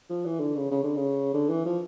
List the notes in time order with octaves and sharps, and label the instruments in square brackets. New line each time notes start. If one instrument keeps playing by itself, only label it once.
[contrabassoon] F3
E3
D3
C#3
C#3
D3
C#3
D3
E3
F3